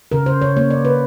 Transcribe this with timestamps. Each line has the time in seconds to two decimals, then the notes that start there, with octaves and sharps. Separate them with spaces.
0.12 C#3 A#4
0.26 C#3 C5
0.41 C#3 C#5
0.57 A#3 C#5
0.70 C#3 D5
0.85 C#3 B4